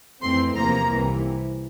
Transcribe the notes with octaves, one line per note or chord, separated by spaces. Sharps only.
F2 E3 A3 C4 C6
E2 C3 F3 A#3 A#5
C2 C3 E3